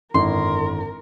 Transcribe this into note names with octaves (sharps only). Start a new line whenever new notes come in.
G#1 F#2 D3 E4 A4 A#4 C6